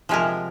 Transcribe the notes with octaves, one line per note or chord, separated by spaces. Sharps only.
C3 F3 G#3 A#4